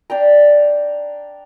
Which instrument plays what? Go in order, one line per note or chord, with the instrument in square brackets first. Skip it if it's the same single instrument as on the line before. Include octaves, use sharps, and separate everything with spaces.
[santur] D4 G5 A#5